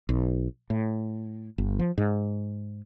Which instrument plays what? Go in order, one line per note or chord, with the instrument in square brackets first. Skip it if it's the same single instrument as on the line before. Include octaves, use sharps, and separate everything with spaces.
[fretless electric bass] B1
A2
G1
F3
G#2